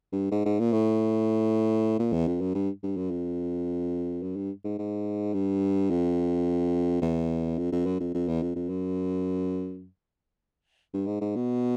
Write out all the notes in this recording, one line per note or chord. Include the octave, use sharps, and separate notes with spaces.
G2
G#2
G#2
A#2
A2
A#2
E2
F2
F#2
G2
G2
F#2
F2
F#2
G2
G#2
G#2
G2
F2
E2
F2
F2
F#2
F2
F2
E2
F2
F2
F#2
G2
G#2
G#2
B2